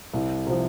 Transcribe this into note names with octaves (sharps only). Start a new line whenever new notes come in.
C2
C3 F3